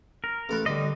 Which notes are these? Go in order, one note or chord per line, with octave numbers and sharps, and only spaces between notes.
A#4
A1 A4 B4
D3 G3 D#5